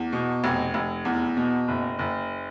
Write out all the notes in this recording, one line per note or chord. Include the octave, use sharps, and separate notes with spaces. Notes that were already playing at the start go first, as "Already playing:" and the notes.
Already playing: E2
B2
F1
F1
E2
B2
F#1
F#1